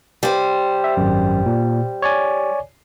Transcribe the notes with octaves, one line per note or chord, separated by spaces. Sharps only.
G3 C5
E5
G#1 F#2
A#2
C#5 D5 G#5